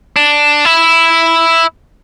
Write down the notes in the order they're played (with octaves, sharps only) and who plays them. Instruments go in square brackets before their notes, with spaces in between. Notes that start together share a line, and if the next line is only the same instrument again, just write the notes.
[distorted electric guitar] D4
E4